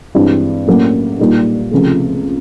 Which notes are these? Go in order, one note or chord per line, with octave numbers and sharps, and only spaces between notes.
G2 E3 G#3 C4 E4
A2 F#3 A#3 C#4
A#2 G3 A#3 D#4
C#2 C3 F3 A3